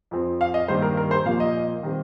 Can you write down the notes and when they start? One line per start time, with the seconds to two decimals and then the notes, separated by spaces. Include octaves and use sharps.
0.11 F2 F3 C4
0.41 F5
0.54 D#5
0.68 G2 D#3 G3 A#3 C5
0.82 A#4
0.97 A#4
1.11 C5
1.25 A#2 F3 A#3 F5
1.40 D#5
1.83 D#3 G3 C4